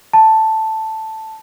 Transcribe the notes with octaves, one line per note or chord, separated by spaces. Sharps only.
A5